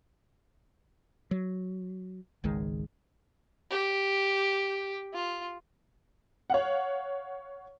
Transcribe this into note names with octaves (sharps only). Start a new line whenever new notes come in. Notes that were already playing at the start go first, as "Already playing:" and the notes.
F#3
G#1 C#2 D#3 G#3
G4
F4
C#5 F5 F#5